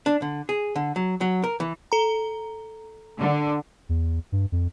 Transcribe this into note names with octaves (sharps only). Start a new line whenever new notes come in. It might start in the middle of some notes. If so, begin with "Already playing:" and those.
D4
D3
G#4
D3
F#3
F#3
A#4
E3
A4 A#5
D3
E2
G2
F2